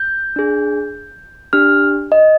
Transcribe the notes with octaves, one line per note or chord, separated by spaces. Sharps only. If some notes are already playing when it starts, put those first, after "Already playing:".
Already playing: G6
D4 G#4
D4 G4 F6
D#5